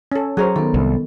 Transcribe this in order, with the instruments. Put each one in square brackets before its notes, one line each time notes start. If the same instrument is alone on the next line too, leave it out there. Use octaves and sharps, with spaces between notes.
[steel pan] C#4 A4
[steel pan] F#3 C#5 [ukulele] G#4 A#4 C5
[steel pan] D#3 [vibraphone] B3 A4
[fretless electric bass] C2